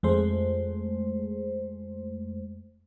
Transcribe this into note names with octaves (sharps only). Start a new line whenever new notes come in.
F2 G#3 A3 C5